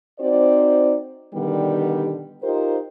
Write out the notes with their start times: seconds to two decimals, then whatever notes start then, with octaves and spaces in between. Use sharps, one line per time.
0.20 C4 D#4 F#4 C5 D5
1.34 B2 D3 D#3 G3 B3 G4
2.43 D#4 F4 G4 A#4 C5